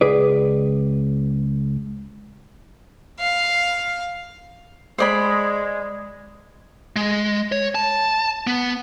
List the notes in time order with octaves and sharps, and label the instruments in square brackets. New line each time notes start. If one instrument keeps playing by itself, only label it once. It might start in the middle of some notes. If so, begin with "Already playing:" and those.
[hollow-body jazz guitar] C#2 G#4 B4 D5
[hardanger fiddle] F5
[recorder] G#3 [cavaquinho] C5 D5 B5
[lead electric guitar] G#3
C#5
A5
B3